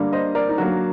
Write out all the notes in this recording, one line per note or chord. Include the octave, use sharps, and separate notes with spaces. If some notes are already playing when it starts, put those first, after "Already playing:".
Already playing: D3 G3 A#3
C5 D#5
A#4 D5
D#4
D3 F#3 A#3 F#4